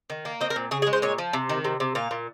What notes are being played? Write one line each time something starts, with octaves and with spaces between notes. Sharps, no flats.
D#3
A#3
C4 D#5
A#4
A#2
C#3 G#4
G#4
G#3
C5
A#2 C#5
F3
C3
D#3
C3
C3
A#2 F5
A#2